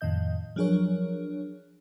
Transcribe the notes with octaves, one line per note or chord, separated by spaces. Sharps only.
F2 A2 D#3 D#5 G6
F3 F#3 D4 G#4 A#4 C#5